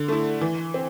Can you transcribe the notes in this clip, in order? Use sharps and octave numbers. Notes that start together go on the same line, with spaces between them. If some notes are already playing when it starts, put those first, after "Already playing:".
Already playing: D3
A3 E4
E3
C4